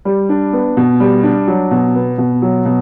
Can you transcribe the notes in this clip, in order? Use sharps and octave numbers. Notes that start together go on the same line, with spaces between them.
G3
D4
B3
B2
G3
D4
F#3
B2
B3
B2
F#3
B2